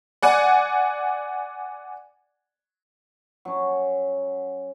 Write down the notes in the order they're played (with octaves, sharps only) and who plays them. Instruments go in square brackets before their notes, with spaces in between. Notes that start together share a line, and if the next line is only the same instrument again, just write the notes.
[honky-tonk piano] D5 F#5 G#5
[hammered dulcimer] F#3 C#4